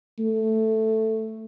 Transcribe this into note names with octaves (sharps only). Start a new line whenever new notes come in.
A3